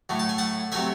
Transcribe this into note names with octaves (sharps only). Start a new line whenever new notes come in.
A2 F#3 A3
A5
G#5
F#5 A5
C3 F#3 A3 E5 G#5